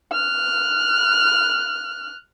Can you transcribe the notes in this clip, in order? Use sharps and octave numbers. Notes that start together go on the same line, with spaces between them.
F6 F#6